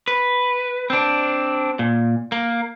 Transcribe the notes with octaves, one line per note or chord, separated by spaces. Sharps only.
B4
C4 D4
A#2
A#3